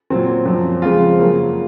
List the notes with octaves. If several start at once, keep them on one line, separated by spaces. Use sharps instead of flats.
A#2 F#3 C4
F#2 F3 C4
F2 C#3 G#3 C4 F4
F#2 C#3 F#3 A#3